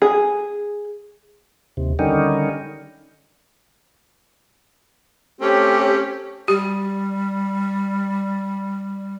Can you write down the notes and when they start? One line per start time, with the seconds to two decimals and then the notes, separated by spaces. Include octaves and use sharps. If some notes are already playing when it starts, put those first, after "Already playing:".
0.02 G#4
1.77 D#2 C3
1.99 D3 D#3 G3 C#4 D#4
5.40 A3 C4 C#4 G4
6.48 G3 G4